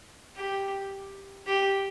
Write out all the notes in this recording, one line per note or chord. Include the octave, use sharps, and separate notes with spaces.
G4
G4